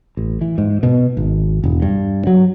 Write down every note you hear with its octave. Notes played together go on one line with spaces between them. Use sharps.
A1
E3
G#2
B2
G#1
E1
G2
F#3